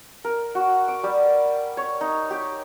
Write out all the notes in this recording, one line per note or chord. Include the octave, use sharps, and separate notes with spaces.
A#4
F#4
D6
G3
C#5
D#4
G4